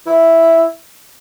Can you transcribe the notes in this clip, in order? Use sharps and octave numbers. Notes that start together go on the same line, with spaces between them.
E4